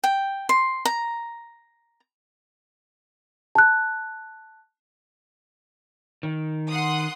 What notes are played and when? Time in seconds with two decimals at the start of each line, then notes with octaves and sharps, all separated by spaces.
0.04 G5
0.49 C6
0.85 A#5
3.55 A5 F#6
6.23 D#3
6.69 F#5 C6 D#6